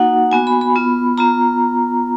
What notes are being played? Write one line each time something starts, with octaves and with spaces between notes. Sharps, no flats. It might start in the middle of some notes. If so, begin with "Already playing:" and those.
Already playing: A#3 D#4 F#4 F#5
B3 F#4 G#5
B5
B5
B3 F4
B3 F4 A#5